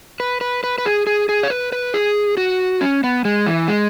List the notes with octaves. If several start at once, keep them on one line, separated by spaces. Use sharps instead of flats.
B4
B4
B4
B4
G#4
G#4
G#4
C#5
B4
B4
G#4
F#4
C#4
B3
G#3
E3
G#3